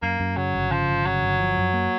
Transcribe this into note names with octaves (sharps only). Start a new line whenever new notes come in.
F#2 A#3
F#2
C#3 F#3
G1
C#3 F3
G1
C#3 F#3
G1
F3
F#2
A#3